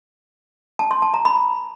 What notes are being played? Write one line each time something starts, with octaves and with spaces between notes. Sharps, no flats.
A5
C6
A5
A#5
B5